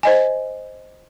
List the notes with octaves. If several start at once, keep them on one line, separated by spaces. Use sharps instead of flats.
C5 D#5 G#5